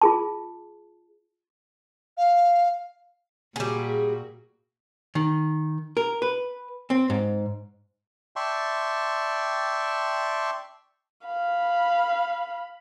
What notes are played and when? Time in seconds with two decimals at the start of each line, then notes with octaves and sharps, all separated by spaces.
0.02 F4 G#4 A5
2.17 F5
3.56 A#2 G3 F#4 G#4
5.15 D#3
5.97 A#4
6.22 B4
6.90 C4
7.10 G#2
8.36 D5 E5 G5 A5 C6 C#6
11.27 F5 B5